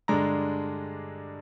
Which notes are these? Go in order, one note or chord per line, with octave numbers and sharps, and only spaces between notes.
G2 D3 G#3 D4 A#5